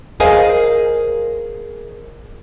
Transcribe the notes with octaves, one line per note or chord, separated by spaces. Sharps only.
G#4 A#4 C5 D#5 F5 G#5